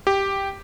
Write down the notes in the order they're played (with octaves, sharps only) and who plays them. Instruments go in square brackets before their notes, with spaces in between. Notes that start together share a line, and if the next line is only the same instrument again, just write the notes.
[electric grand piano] G4